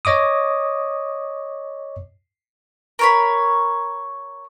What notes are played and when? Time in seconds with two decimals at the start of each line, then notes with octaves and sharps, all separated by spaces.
0.05 C#5 D#5 D6 D#6
2.99 A#4 C#5 B5